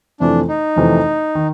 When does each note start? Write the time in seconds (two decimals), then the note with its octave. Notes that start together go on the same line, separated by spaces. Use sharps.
0.20 F2 C3 E3 A3 D4
0.48 D#4
0.76 F2 C3 E3 A3
1.35 D#3